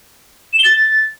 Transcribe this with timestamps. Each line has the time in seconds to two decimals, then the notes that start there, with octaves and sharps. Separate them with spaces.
0.53 E7
0.59 G7
0.64 A6